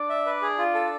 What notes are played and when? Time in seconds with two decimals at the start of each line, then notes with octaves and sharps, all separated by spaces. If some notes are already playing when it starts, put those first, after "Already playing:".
Already playing: D4 D5
0.10 E5
0.26 B4
0.42 G#4
0.58 F4
0.74 A4